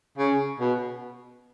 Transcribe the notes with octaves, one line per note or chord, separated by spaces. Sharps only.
C#3
B2